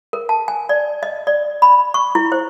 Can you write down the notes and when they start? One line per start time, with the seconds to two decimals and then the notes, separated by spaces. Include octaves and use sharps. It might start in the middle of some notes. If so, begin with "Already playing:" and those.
0.13 A#4
0.29 A5
0.48 G#5
0.69 D5
1.03 D#5
1.27 D5
1.62 B5
1.94 C#6
2.15 E4
2.32 C5